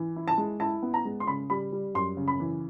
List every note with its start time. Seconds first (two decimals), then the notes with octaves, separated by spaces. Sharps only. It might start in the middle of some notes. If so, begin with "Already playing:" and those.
Already playing: E3
0.16 E4
0.28 A5
0.38 G#3
0.60 E4 A5
0.83 B3
0.94 A#5
1.05 G#3
1.20 C6
1.27 C#3 B5
1.50 G3 B5
1.72 G3
1.95 F#2 C6
2.17 C#3
2.28 B5
2.40 E3